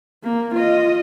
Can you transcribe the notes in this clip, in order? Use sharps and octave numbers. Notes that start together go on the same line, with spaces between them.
A#3
F4 D#5